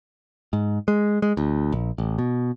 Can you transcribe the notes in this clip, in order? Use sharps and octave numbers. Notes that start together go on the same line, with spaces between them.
G#2
G#3
G#3
D2
A#1
A1
B2